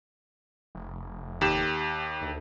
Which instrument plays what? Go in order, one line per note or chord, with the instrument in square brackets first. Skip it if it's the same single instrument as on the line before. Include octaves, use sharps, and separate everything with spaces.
[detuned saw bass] F1
[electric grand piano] D#2 G4 E7
[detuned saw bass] D2